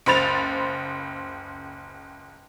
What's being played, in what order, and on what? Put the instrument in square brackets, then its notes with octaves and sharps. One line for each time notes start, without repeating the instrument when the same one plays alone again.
[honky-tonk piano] F#1 C#2 C5 B5 A6 F7